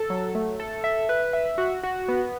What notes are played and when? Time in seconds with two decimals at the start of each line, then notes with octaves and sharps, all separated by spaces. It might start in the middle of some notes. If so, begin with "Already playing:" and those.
Already playing: A4
0.10 F#3
0.35 A3
0.60 A4
0.84 E5
1.09 B4
1.33 E5
1.58 F#4
1.83 F#4
2.08 B3